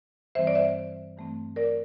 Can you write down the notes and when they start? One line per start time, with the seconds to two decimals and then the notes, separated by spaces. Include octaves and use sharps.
0.35 G2 E3 G3 C4 C5 E5
0.47 D5
0.55 C5 E5
1.16 G2 E3 A3 C4
1.56 A#4 D5